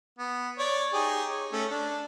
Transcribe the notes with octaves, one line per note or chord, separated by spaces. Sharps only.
B3
C#5 D5
D#4 G4 G#4
C#5
A3 C#4 A4
D4